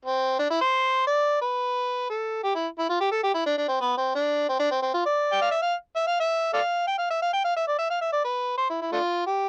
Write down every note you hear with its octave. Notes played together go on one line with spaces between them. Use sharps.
C4
D4
E4
C5
D5
B4
A4
G4
E4
E4
F4
G4
A4
G4
E4
D4
D4
C4
B3
C4
D4
C4
D4
C4
C4
F4
D5
G5
F5
E5
F5
E5
F5
E5
A4 D5 F5
G5
F5
E5
F5
G5
F5
E5
D5
E5
F5
E5
D5
B4
C5
E4
E4
A3 D4 F4
G4